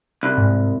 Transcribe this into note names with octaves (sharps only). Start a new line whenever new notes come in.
C2
G#2